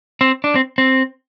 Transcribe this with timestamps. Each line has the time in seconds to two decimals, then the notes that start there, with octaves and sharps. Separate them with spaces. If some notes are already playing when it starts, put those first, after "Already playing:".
0.21 C4
0.44 D4
0.55 C4
0.78 C4